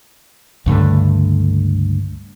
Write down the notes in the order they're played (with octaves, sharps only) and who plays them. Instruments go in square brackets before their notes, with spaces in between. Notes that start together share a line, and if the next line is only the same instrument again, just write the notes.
[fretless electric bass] C#2 G2 D3 A3